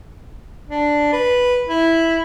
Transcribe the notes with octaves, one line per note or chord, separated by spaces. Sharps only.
D4
B4
E4